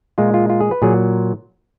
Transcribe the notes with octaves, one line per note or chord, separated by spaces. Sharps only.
A#2 G#3 F4
F4
F4
G#4
B4
A#2 F#3 G#4